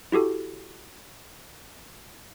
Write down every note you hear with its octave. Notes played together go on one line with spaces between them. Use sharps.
E4 F#4 G4 A4